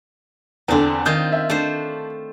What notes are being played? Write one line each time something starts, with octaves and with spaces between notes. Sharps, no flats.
E2 D3 C4 D4
D#3 F4 D#6 G6
E5
A3 D4 C5